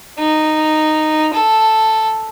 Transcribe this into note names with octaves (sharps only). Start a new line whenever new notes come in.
D#4
A4